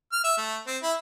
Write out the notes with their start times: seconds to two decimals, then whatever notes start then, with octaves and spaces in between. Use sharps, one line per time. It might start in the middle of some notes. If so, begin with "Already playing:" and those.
0.13 F6
0.25 E5
0.38 A3
0.67 C4
0.83 E4